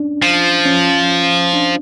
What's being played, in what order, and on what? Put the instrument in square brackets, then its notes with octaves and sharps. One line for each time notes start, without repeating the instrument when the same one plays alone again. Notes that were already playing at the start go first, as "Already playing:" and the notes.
Already playing: [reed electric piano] C#4 D4
[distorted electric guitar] F3
[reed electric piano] C#4
D4